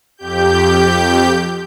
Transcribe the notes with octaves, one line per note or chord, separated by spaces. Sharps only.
F2 G4 G6